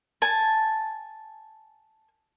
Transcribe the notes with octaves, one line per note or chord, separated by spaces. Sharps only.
G#5 A5